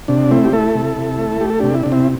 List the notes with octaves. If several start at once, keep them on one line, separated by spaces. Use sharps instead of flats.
C3 D4
A3 C4 E4
G4
A3 E4 A4
C3
C3
A3
A3 G4
A4
C3 D4 G4
E4
C3 D4
C4 E4